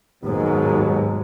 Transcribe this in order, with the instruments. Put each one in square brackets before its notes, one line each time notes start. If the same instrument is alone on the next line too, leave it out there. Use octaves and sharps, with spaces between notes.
[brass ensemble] D#2 B2 F#3 [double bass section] G#2